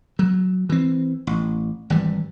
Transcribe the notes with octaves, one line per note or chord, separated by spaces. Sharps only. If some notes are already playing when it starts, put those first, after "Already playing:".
F#3
E3 C4
A1
G#1 E3 G3